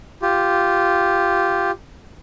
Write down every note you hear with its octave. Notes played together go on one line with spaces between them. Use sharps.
F4 G4